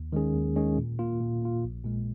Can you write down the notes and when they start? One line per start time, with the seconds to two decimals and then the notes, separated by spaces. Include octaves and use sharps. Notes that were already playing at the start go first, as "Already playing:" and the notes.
Already playing: D#2
0.12 D#3 G#3 C#4 G#4
0.34 D#2
0.56 D#3 G#3 C#4 G#4
0.78 A#2
0.99 A#3 F4
1.21 A#2
1.42 A#3 F4
1.64 A#1
1.84 A#2 G#3